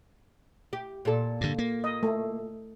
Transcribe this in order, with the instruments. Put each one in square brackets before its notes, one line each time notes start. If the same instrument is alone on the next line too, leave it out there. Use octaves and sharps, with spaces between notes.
[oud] G4
A#2 A4
[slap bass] G2 D3
A#3
[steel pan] D#5
A3